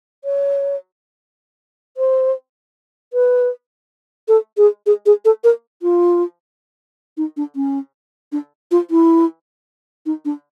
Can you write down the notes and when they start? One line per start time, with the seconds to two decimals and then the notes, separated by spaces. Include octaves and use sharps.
0.24 C#5
1.97 C5
3.13 B4
4.28 A4
4.57 G#4
4.86 G#4
5.06 G#4
5.25 A4
5.44 A#4
5.82 F4
7.17 D#4
7.37 D4
7.56 C#4
8.32 D4
8.71 F4
8.91 E4
10.06 D#4
10.25 D4